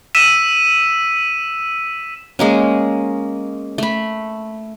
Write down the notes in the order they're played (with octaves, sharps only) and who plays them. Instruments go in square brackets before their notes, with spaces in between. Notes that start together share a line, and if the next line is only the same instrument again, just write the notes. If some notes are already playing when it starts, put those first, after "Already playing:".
[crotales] E6 B6 D#7 E7
[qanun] G#3 A#3 C#4
A3 B5